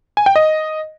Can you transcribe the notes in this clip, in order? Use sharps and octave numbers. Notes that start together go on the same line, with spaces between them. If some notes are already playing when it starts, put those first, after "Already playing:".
G#5
G5
D#5